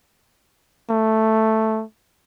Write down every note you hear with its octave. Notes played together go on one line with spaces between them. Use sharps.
A3